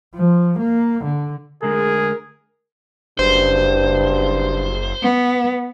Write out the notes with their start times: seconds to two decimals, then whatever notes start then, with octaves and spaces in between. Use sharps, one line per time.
0.15 F3
0.59 A#3
1.04 D3
1.63 D3 G#3 A3 G#4 A#4
3.19 F#1 G2 C5
5.03 B3